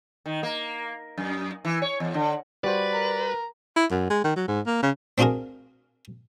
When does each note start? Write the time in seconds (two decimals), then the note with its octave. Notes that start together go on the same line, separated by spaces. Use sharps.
0.26 D#3
0.43 A#3
1.18 F#2
1.65 E3
1.82 C#5
2.00 E2
2.14 D3
2.64 G3 F#4 B4 C5 D5
2.94 A#4 A#5
3.77 E4
3.91 F#2
4.10 G#3
4.24 D#3
4.36 F#3
4.48 G#2
4.66 A#3
4.82 C#3
5.18 C4 D4 F4 F#4 G#4 A#4